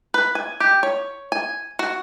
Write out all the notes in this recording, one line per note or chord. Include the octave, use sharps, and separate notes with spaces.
B4
G#5
G4
C#5
G#5
F#4